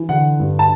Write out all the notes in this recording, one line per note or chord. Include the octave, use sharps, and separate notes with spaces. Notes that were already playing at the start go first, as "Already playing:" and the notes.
Already playing: E3
D3 F#5
G2
A5